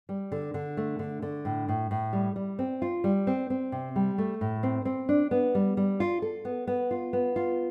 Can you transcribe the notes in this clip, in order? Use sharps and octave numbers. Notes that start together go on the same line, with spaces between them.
G3
D3
D3
A3
D3
D3
A2
A2
A2
G3
G3
C4
F4
G3
C4
C4
C3
G3
A3
A2
C4
C4
D4
B3
G3
G3
F4
A4
B3
B3
F4
B3
F4